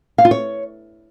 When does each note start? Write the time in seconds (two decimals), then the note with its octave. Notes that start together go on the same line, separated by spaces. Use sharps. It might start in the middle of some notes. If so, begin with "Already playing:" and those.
0.18 F5
0.25 F4
0.31 C#5